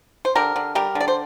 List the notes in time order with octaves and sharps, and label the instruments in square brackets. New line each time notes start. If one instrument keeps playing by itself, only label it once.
[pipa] C5
D3 G4 A#4
D3
G3 G4 A#4
D3
D5
C5